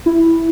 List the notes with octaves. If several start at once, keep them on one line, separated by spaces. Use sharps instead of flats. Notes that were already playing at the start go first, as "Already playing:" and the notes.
E4